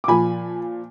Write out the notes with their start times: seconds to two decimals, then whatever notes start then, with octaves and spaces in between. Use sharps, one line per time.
0.04 D6
0.08 A#2 F3 G#5 B5